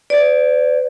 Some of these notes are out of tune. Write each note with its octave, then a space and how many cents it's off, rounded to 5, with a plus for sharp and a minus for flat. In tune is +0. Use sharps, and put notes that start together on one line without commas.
B4 +45 D5 -5